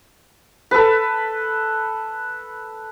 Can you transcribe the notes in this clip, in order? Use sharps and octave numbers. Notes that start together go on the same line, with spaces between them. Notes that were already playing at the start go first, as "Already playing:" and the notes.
A4 B4